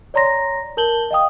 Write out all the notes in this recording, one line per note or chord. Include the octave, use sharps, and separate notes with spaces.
C#5 D5 A#5 C6 A#6
A#4 A5 G6 F#7 G7
D#5 F5 G5 D#6